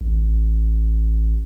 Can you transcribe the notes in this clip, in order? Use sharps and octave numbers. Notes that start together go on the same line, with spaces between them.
A1